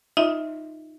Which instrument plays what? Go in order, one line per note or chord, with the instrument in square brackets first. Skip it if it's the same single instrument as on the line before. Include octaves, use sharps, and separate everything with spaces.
[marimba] D#4 F4 D#5 E5